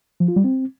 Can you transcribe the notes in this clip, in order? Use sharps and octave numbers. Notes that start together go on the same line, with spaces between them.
F3
F4
G3
C4